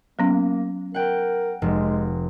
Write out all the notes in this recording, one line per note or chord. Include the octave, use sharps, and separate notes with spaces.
F#3 A#3 B3 C#4
A#4 F#5 G5
F1 G#3